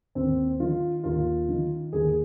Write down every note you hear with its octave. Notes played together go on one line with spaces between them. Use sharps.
D#2 C4
D#3 F4
D#2 F4
D#3
D#2 G#4